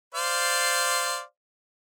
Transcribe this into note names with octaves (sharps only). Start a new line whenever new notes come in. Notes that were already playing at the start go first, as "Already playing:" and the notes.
C5 D5 F5